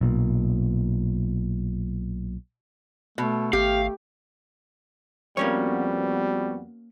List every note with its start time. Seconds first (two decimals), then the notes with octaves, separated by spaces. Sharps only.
0.01 B1 A#2
3.18 B2 A3
3.53 G#1 A3 G4 F5
5.37 F2 G3 A#3 B3 C#4 F#4 C#5